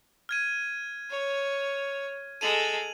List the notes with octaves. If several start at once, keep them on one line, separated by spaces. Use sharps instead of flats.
F6 G#6 D#7
C#5
G#3 A4 D#7 F7 F#7